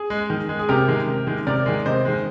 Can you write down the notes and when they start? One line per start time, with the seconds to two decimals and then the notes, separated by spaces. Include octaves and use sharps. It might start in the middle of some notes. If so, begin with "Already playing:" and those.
Already playing: G#4
0.10 G#3
0.30 D#3
0.49 G#3
0.59 G#4
0.69 C3 G4 A#4
0.88 D#3 G#3
1.07 C3
1.27 D#3 G#3
1.47 C3 A#4 D5
1.66 D#3 G#3
1.86 C3 C5 D#5
2.05 D#3 G#3